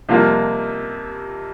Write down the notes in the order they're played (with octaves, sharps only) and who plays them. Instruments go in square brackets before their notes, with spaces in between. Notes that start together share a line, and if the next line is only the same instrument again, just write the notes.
[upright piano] F2 C3 G3 A#3 F4